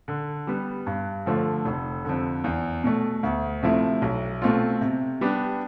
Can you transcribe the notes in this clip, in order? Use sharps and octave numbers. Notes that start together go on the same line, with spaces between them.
D3
G3 B3
G2
D3 F3 A3
F1
F2 D3
E2
B2 A3
D2
C3 F3 A3 E4
B1
B2 A3 C4 F4
C3
G3 B3 D4 G4